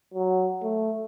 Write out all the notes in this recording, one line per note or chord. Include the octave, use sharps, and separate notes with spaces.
F#3
A3